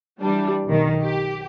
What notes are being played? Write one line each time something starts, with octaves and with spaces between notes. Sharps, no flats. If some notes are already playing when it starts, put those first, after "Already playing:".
E3 G3 D4
B1 D#3
G4